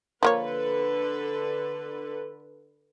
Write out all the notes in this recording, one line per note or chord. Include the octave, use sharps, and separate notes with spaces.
D3 F3 A#3 A4 B4 C#5